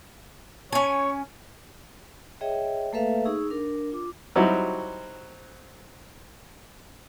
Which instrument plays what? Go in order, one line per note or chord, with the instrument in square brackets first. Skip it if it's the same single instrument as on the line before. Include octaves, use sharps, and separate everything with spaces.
[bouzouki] C#4 G#5 [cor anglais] C#5
[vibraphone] G#4 C#5 D#5 E5 G5
A3 A#3 A4 B4 E5 F5
D#4 G#4 C#6 E6
D4 A#4
F4 D6
[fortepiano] F#3 G3 C4 D#4 E4 F#4